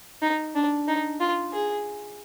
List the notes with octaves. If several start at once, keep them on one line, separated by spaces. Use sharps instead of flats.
D#4
D4
D#4
F4
G#4